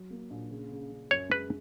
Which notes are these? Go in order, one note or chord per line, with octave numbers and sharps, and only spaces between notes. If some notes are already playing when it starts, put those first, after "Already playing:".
Already playing: F#3
A#3
A#1
C#3
C#3
C#3
F#2 C#5
G#3 B4